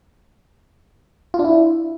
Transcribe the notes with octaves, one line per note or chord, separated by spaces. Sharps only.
F4
D4
E4